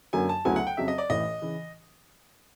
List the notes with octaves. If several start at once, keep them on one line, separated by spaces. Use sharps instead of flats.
F#2 D3 F#3 A#3 G#5
A5
D2 C#3 F#3 B3 E4 G#5
F#5
G5
F2 C#3 F#3 E5
D#5
D5
A1 A2 E3 D#5
C#3 E3